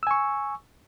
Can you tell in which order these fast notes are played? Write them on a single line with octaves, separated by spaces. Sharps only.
E6 G#5 C#6